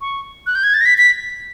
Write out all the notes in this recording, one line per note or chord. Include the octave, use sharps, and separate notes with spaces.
C#6
F#6
G6
G#6
A6
A#6
B6
B6